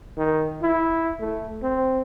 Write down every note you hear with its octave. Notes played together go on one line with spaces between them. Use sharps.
D#3
E4
A3
C4